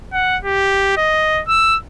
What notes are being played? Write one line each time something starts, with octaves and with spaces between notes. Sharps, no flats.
F#5
G4
D#5
E6